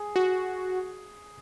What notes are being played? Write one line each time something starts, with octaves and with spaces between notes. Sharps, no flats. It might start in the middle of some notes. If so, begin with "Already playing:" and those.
Already playing: G#4
F#4